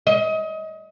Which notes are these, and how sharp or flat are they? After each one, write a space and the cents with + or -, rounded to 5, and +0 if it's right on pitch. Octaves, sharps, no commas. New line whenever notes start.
D#5 +30